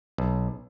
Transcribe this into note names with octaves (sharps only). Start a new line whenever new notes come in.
B1